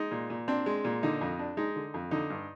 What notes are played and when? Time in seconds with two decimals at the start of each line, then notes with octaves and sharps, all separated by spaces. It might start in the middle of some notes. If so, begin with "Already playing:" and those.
Already playing: G#3 D#4
0.11 A#2
0.30 A#2
0.48 C4 D4
0.66 G#3
0.85 A#2
1.03 D3 D#4
1.21 F2
1.39 D4
1.57 G#3 D#4
1.76 D3
1.94 F2
2.11 D3 D#4
2.30 G2